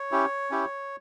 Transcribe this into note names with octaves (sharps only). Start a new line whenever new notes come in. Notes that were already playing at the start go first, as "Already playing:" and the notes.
Already playing: C#5
C#4 E4 G4
C#4 E4 G4